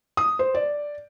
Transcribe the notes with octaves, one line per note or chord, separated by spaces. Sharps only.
D#6
C5
D5